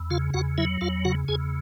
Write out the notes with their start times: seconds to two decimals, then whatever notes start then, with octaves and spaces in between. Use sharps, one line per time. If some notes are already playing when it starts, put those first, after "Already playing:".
Already playing: E2
0.10 C#3 F4 F5
0.34 E2 F#4 F#5
0.58 F#3 E4 E5
0.81 E2 F4 F5
1.05 C#3 F#4 F#5
1.28 E2 G#4 G#5